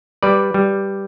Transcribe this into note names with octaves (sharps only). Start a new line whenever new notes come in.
G3 B4 D5
G3